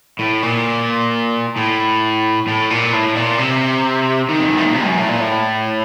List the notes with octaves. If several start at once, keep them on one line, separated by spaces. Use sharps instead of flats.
A2
A#2
A2
A2
A#2
A2
A#2
C3
D#3
F2
F#2
A2
A#2
C3
F#2
A2
A#2
A2